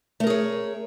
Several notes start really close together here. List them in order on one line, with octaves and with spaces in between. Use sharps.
A3 A#4 G#4 C#5